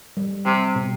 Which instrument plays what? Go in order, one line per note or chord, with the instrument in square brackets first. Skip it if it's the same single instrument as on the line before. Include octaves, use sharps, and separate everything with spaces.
[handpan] G3
[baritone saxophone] C3 [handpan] G3
[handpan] B2